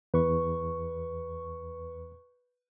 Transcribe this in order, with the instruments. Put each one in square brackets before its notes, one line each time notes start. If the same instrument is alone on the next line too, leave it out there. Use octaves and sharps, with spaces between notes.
[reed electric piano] E2 [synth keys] B4 C#6